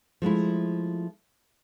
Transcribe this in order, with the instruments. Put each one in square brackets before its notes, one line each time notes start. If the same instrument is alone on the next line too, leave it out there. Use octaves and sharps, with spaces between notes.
[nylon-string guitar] F3 G#3 A3 E4